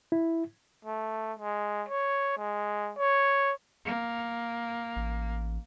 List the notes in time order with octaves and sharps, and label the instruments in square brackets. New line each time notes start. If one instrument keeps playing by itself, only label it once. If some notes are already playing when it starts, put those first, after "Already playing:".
[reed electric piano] E4
[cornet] A3
G#3
C#5
G#3
C#5
[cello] A#3
[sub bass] A1